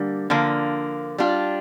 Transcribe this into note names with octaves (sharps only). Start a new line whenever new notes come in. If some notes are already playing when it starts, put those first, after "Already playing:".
Already playing: D3 G3 A#3
D3 F3 A#3
G3 D4 F4